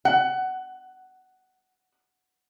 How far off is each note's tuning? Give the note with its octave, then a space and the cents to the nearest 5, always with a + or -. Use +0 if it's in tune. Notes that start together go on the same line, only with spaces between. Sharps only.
F#5 +20